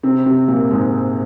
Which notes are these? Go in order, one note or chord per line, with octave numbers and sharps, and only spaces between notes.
C3 C4
C3 C4
A#2 A#3
G#2 G#3